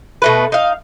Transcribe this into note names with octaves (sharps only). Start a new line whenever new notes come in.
B2 A3 B4
D#4 F5